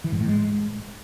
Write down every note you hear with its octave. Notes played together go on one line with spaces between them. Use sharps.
E3
G#2
A2
G#3